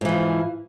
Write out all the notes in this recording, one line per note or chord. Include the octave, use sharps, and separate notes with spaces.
G#2 E3 F3